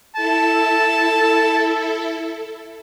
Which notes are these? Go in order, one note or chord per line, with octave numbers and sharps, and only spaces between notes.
E4 A4 A5